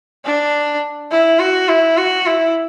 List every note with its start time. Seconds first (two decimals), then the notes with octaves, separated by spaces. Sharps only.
0.25 D4
1.11 E4
1.39 F#4
1.69 E4
1.97 F#4
2.26 E4